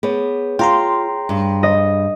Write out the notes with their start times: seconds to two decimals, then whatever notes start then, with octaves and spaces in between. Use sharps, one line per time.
0.03 B3 G#4 C#5
0.59 F4 G5 A#5 C6
1.29 G2
1.63 D#5